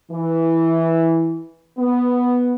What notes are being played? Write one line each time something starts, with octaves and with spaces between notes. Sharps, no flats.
E3
B3